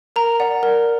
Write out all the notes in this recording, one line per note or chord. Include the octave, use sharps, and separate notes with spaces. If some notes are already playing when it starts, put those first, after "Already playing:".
A#4 A#5
D5 F#5
A#4